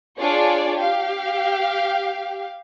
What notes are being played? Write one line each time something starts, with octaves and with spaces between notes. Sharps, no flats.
D4 F4 G#4 C#5 D5
G4 F5